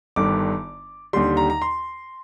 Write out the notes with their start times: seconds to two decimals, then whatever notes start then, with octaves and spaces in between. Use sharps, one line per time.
0.16 G1 G2 D#3 D6
1.13 D#2 D3 G3 C6
1.37 A#5
1.50 A#5
1.62 C6